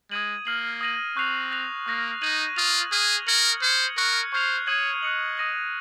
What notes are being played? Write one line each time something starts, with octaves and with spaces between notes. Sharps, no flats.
G#3 D#6 G#6 D#7 F#7
A#3 F6 C7 F#7
D#6 A#6 D#7 F#7
C4 C#6 F#6 C7 F7
F#6 A#6 F7
A#3 C#6 F#6 A#6
D#4 G#6 D#7 F#7
F4 D#6 A#6 F7
G#4 F6 G#6 D#7 F#7
A#4 G#6 C#7 F#7
C5 F6 G#6 C#7
A#4 C#6 F#6 C#7
C5 C#6 F6 G#6 C7 F7
C#5 D#6 G#6 D#7 F#7
D#5 F#6 C#7 F#7
D#6 A#6 D#7 F#7